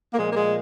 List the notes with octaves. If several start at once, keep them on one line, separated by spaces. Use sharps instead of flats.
A#3
A#2 F3 G#3
A#3
G#3